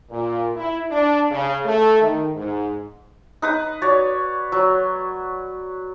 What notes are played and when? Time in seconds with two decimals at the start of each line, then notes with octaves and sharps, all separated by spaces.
0.10 A#2
0.56 E4
0.90 D4
1.31 C#3
1.65 A3
2.01 D#3
2.36 G#2
3.42 D#4 B4 D#6
3.82 F#4 C#5 D5
4.52 F#3